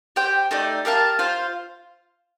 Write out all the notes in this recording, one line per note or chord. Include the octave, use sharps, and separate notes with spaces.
G4 C5 G5
A3 D#4 G4 D5
G4 A#4 F5 A5
F4 C5 F5